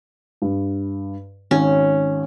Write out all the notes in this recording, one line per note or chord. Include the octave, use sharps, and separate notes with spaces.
G2
G#1 C#4